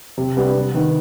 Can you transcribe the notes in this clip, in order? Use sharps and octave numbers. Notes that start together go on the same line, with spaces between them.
C3
G3 B3 D4
C3
D#3 B3